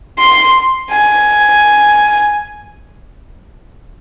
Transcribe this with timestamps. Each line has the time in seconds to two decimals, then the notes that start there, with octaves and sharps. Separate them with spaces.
0.18 C6
0.91 G#5